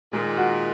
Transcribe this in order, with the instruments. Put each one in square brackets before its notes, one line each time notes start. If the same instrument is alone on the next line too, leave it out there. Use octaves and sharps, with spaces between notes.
[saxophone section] A#2 D#3 [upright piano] G#3
[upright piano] F#4